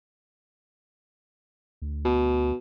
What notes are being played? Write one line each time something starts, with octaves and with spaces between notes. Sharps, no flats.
D2
B2